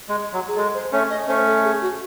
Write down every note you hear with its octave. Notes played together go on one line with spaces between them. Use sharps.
G#3
F#3
G#4
G#3 A4
C5
A3 C#4 C#5
D#5
A3 C#4 C5
A4
G#4
F#4